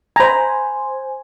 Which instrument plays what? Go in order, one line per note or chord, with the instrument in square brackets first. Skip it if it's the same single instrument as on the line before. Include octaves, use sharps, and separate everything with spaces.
[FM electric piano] C5 G#5 [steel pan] A#5 B5